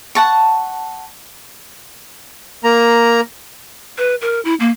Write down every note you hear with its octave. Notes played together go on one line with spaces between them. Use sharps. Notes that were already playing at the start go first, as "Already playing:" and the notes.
F#5 A5 C#6
A#3 A#5
B4
A#4
E4
A#3